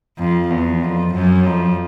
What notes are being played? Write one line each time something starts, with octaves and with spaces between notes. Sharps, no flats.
F2
E2
F2
F#2
F2